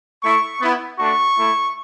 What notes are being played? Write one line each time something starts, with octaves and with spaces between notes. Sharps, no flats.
A3 E4 C#6
B3 E4
A3 D4 F#4 C#6
A3 E4